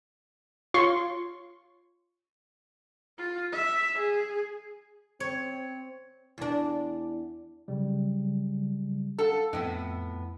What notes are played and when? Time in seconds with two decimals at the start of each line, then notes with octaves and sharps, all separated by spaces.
0.74 F4 C#5 C6 C#6
3.18 F4
3.52 E5
3.98 G#4
5.20 C4 C#5
6.38 E2 D4
7.68 C#3 F#3 G3
9.19 A4 F5 F#5 A5
9.53 F2 A2 B3